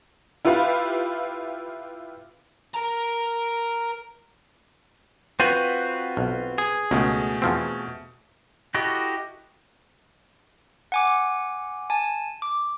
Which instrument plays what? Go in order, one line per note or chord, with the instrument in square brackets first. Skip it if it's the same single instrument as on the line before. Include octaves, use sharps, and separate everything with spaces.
[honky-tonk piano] E4 F4 G4 B4 F5
[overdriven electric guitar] A#4 A#5
[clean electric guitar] C4 F4 F#4 [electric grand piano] B4 G6 D#7
[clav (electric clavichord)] B1
[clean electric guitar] G#4
[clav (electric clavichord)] C#2 [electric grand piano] B2 A3
[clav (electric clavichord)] E2 F3 C4
[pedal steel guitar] E4 F#4 G4 A4 D#5
[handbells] F#5 G#5 D6
G#5 A5
D6